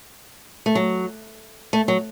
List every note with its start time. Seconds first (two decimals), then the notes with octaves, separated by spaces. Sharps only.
0.66 A3
0.75 F#3
1.73 A3
1.88 F#3